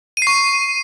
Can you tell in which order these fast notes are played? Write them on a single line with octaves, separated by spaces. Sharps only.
D#7 C7 C#6